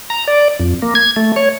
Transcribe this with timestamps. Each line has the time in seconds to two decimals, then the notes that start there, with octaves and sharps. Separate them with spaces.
0.10 A#5
0.27 D5
0.59 F2
0.82 A#3
0.95 G#6
1.16 A3
1.36 C#5